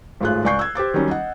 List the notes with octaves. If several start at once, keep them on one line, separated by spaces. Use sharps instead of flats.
G#1 A2 F4 G#4 F#6
C#2 D5 G#5 C#6 G6 C7
E6 G#6
G4 C5 D6 A6
D#3 F#3 G3 C#4
D#5 F#5